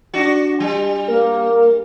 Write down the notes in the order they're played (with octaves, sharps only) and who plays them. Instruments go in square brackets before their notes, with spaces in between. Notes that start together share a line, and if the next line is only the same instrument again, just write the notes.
[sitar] D4 F#4
G3
[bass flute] A#3 [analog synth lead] A#4